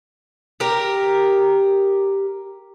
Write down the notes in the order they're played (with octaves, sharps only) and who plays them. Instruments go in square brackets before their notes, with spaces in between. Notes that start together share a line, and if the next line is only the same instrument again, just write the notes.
[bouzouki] G4 A#4